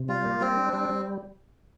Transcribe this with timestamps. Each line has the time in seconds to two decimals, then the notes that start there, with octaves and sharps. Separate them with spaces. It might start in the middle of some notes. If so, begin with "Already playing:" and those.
Already playing: C3
0.09 G3 F4
0.25 A#3
0.41 G3 C4
0.57 D4
0.73 G3 C4
0.89 G3